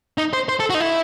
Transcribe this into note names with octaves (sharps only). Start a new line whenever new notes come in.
D#4
C5
C5
A4
F#4
D#4
E4